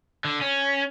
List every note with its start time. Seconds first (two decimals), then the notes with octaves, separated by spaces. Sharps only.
0.24 D3
0.41 C#4